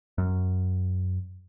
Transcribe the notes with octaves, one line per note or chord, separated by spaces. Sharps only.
F#2